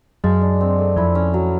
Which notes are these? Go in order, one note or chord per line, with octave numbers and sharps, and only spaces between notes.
F#2 F#3 G#3
D4
C4
A3
F2 F3 E4
C#4
F#3